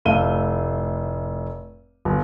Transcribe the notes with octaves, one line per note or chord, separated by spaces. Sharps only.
F1 A2 A3 F5 D#7 G7
G1